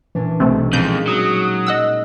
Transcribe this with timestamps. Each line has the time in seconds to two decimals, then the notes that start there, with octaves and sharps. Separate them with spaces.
0.15 A#2 E3 C#4 D4
0.40 B1 C3 G3 A3
0.73 F2 A#2 G#3 D#4 G6
1.08 F#3 D#6
1.67 D#5 F#5 E6